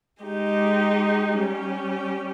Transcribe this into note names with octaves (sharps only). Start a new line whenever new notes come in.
G#3 D#4 G4
G3 C#4 G4